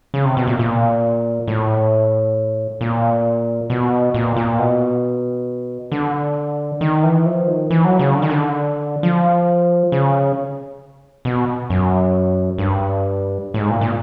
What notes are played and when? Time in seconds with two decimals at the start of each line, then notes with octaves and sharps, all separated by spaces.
0.14 C#3
0.25 C3
0.37 B2
0.48 A#2
0.59 A#2
1.48 A2
2.81 A#2
3.70 B2
4.14 A#2
4.37 A#2
4.59 B2
5.92 D3
6.81 D#3
7.03 E3
7.26 F3
7.47 D#3
7.70 E3
7.85 F#3
7.99 C#3
8.14 D3
8.22 D#3
8.30 D3
9.03 F3
9.92 C#3
11.25 B2
11.70 F#2
12.58 G2
13.54 A2
13.59 G#2
13.70 A#2
13.81 A#2